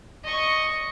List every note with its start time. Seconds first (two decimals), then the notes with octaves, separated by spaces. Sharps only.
0.24 D#5 C#6